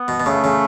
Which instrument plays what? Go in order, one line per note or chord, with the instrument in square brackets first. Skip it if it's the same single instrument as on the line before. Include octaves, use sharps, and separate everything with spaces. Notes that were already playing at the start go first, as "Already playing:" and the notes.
Already playing: [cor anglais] B3
[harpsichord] B2
B2
[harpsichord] C#3 [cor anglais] A3
[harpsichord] C#3